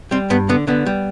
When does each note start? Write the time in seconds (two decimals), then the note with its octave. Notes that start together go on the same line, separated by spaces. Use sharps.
0.11 G3 C4
0.30 G2 B3
0.49 D3 B3
0.67 D3 B3
0.86 G3